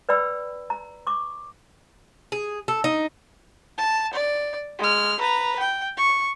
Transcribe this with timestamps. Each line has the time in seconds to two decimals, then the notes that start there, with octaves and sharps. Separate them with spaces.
0.09 B4 D5 G5 B5 E6
0.70 A#5
1.07 C#6 D6
2.32 G#4
2.68 A4
2.84 D#4
3.78 A5
4.13 D5
4.79 G#3 F6
5.20 B4 A#5
5.60 G5
5.97 C#6